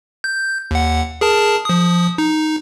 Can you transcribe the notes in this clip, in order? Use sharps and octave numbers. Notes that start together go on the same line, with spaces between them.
G6
D#2 F#5
G#4 A#4 A5
F3 D#6
D#4